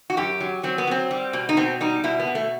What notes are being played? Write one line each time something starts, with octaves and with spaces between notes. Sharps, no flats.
F#4
F#2 G4
F#3
F#3 C4
B3
F#3 C4
G3
B2
D#4
B2 C4
G3 D#4
B2 E4
B3
B2
A3